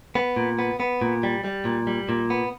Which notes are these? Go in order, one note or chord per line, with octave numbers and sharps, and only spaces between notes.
B3
A#2
B3
B3
A#2
G3
G3
A#2
G3
A#2
B3